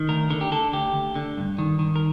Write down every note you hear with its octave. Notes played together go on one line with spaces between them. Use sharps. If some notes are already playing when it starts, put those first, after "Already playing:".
Already playing: D#3
D2 A#4
D3 A#4
G4
D3 A4
D2 G4
D2
D3
G2
D#3
D#3
A#4